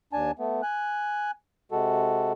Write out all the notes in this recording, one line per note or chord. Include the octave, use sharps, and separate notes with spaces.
D#2 D4 G#5 A5
A3 B3
G#5 F#6
C3 G#3 F#4 A4